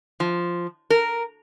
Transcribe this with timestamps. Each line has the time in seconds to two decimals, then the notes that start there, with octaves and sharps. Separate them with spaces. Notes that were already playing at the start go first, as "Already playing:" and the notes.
0.20 F3
0.90 A#4